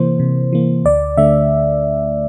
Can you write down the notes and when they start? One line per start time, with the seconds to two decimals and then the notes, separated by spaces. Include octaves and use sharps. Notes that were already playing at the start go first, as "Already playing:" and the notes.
Already playing: C3 E3 A#3 C5
0.20 C3
0.53 E3 A#3
0.85 D2 D5
1.17 D3 A3 E5